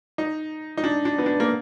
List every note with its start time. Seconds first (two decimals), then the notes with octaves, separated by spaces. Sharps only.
0.18 D#4
0.77 D#4
0.84 D4
1.05 D4
1.18 B3
1.26 D4
1.40 A#3